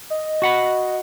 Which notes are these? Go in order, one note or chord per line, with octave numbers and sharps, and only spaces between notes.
D#5
F#4 F#5 B5